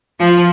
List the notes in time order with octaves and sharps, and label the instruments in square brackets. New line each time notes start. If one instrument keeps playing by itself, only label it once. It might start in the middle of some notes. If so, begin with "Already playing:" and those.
[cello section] F3